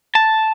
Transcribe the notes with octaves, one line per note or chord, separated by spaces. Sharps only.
A5